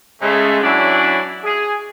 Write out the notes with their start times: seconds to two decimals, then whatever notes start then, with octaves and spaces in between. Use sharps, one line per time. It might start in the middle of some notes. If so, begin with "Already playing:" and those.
0.21 C#3 G#3 A3
0.62 E3 F#3 C#4 D4 E4
1.44 G#4